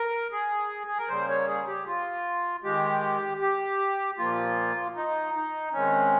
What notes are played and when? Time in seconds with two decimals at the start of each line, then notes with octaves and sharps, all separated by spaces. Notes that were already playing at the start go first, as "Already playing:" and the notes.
Already playing: A#4
0.32 G#4
0.87 G#4
0.98 A#4
1.08 C#3 G3 A#3 C5
1.29 C#5
1.47 G#4
1.67 G4
1.87 F4
2.63 D#3 G#3 G4
3.41 G4
4.18 A#2 F3 A#3 F4
4.95 D#4
5.34 D#4
5.72 C3 D#3 G#3 C#4